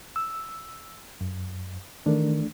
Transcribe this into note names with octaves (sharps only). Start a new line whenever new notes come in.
E6
F#2
D#3 E3 A3 D4 A#4